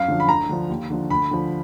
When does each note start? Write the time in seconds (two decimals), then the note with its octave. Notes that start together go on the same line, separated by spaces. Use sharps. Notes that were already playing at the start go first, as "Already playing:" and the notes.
Already playing: F#2 F5
0.08 D3 F3
0.20 B5
0.28 D2 A#5
0.49 D3 F3
0.69 D#2
0.90 D3 F3
1.10 D2 B5
1.31 D3 F3